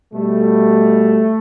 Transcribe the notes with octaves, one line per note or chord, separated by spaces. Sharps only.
B2 G3 A3